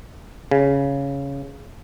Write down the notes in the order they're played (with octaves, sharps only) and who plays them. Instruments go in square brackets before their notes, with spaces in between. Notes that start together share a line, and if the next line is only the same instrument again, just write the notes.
[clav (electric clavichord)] C#3